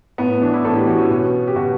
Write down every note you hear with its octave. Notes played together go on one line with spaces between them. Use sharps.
A2 B3
E3 D4
E4
A2 A4
G4
E3 F#4
C#4
B2
G4
B2 F#4